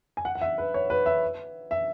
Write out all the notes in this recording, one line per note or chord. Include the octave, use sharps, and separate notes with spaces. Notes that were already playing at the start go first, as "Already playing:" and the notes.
G#5
F#5
F#5
E5
B4
C#5
B4
E5
E5